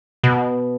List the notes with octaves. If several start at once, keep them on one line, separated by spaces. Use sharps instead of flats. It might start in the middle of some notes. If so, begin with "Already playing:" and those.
B2